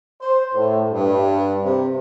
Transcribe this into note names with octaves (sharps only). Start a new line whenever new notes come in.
C5
A2
G2
C3